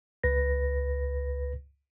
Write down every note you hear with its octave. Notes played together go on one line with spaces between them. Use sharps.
C#2 B4 A#6